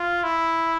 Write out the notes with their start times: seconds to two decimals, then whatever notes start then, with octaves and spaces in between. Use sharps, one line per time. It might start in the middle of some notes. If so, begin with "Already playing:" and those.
Already playing: F4
0.23 E4